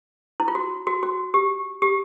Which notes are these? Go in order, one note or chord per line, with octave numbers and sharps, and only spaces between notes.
E4
F4
F#4
F#4
F#4
G4
G4